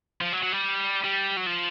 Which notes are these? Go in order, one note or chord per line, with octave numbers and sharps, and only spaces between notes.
F3
F#3
F#3
G3
G3
F#3
F3